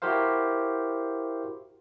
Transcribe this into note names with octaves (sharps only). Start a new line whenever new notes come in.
E4 F#4 G4 A#4 C5 F5